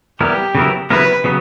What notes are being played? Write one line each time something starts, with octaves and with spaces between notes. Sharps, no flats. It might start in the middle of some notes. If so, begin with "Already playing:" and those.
G3 B3 E4 G4 A#4
C#3 F#3 B3 E4 A#4
C#3 F#3 B3 E4 A#4 B4
C#3 F#3 B3